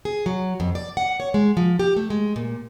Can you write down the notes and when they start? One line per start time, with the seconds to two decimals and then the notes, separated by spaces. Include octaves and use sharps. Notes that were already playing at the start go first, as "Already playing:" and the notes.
0.05 G#4
0.26 F#3
0.60 F2
0.75 D5
0.97 F#5
1.20 C#5
1.34 G#3
1.57 F3
1.79 G4
1.96 A3
2.10 G#3
2.36 A#2